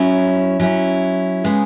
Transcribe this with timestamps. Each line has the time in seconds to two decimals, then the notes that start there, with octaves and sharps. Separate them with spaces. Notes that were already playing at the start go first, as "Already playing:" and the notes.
Already playing: F#3 C#4 E4
0.60 F#3 C#4 E4
1.44 C#3 G#3 B3